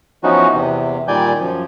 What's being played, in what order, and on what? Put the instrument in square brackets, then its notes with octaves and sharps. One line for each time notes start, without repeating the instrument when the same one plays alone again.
[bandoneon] E3 F3 B3 C#4 D#4 F#4
E2 C3
A#2 D#3 G3 D5 G#5 G6
F#2 F3